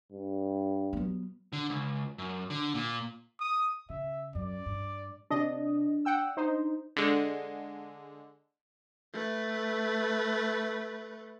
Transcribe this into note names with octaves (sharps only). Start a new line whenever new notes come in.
G2
F#3 B3
D3
C#2
F#2
D3
A#2
D#6
C#3 E5
F#2 D5
G2
C3 D4 D#5
F#5 G5 E6
D#4 C5
D3 G#3
A3 B4